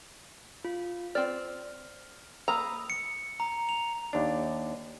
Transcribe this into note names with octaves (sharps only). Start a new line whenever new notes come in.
F4
C4 D5 F6
A#3 A#5 B5 D#6 E6
C#7
A#5
F7
D#2 D4